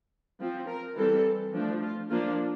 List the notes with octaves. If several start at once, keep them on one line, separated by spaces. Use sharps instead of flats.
F3 C4
A#4
E3 G3 C4 A4
F3 A3 D4
F4
F3 A#3 D4 F4